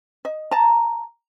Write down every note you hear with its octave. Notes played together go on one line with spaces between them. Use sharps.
D#5
A5 A#5